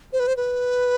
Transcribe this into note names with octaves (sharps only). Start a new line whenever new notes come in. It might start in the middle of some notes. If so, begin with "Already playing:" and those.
C5
B4
C5
B4